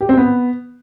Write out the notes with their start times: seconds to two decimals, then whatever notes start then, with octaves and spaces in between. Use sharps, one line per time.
0.01 G4
0.09 C4
0.17 B3